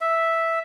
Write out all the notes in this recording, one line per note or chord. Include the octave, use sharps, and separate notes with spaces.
E5